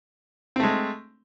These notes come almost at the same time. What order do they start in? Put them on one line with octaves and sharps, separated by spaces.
C4 A3 G#3